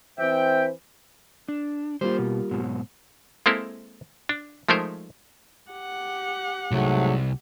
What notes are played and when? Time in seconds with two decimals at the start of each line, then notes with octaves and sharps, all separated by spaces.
0.18 E3 C4 C5 E5 G5
1.49 D4
2.01 G3 A#3 F4 C5
2.19 B2
2.51 G#2 B2 F#3
3.46 G#3 A#3 C4 E4 A4 A#4
4.29 D4
4.69 F3 G#3 A3 D#4 A#4 C5
5.71 G4 F#5
6.72 C2 G#2 F#3 A3